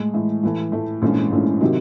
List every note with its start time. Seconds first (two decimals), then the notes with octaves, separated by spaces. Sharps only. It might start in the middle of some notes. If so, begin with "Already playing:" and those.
Already playing: A2 G#3
0.14 A2 E3 G#3
0.43 A2 E3 A3
0.72 A2 E3 A3
1.02 A#1 G#2 E3 A3 C#4
1.32 A#1 G#2 E3 A3 C#4
1.61 C3 D#3 F#3